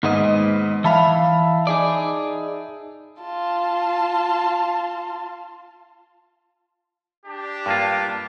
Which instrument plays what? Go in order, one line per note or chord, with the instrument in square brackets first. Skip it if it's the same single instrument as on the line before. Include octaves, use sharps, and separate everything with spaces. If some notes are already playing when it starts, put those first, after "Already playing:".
[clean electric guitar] D#2 B3 D#5 [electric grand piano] G#2
[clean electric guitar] E3 F5 [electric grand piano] E5 A5 B5
[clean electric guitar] D#4 G#4 D5
[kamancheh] F4 A5
[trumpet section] D4 G4
[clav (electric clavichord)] G2 A#3 F4